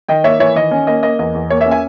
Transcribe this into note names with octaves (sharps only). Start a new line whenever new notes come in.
D#3 D#5 G5
A#3 C#5 E5
E3 C#5 E5
D#3 D#5
C#4
A#3 D#5
A#3 D#5
E2 D#5
E2
A#3 C#5
C#5 E5
C#4
E5 G#5